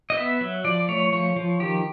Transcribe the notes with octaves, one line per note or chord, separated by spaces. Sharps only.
D#5
B3 E5
F#3
F3 D5
A3 C#5
F3 C#5
F3
D#3 G4